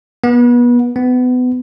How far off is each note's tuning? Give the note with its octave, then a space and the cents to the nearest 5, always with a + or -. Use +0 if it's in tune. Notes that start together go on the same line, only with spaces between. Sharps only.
B3 -30
B3 +25